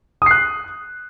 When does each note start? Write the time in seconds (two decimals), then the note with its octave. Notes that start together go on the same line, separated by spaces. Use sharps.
0.22 D#6
0.26 C7
0.31 F#6